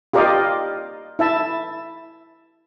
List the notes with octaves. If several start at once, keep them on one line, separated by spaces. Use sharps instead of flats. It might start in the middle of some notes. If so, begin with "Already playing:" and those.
F4 G4 A#4 D5 D#5 F5
E4 E5 A5